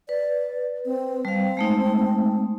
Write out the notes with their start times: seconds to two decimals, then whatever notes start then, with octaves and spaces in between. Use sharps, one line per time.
0.09 B4 D5
0.86 C4
1.25 G3 C4 F5
1.57 G#3 A3 D#4